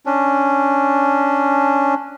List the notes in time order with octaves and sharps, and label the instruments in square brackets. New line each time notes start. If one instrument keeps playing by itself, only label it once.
[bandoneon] C#4 D4